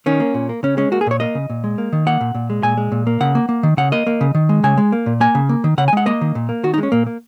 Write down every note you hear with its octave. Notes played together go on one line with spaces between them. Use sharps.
D#3 C#4
A#3
A#2
A#3
C#3 C#4
G#3 C#4
A#3 F#4
G#4
A#2 C#5
A#3 D#5
C#3
A#2
G#3
A#3
D#3
A#3 F#5
A#2
A#2
G#3
A#2 G#5
G#3
A#2
A#3
C#3 F#5
A#3
A#3
D#3
C#3 F#5
A#3 D#5
A#3
C#3
D#3
G#3
C#3 G#5
G#3
A#3
A#2
A#3 G#5
C#3
A#3
D#3
C#3 F#5
G#5
G#3 F#5
A#3 D#5
D#3
A#2
A#3
D#3 F#4
D#4
G#3
C#4
A#2 A#3
A#3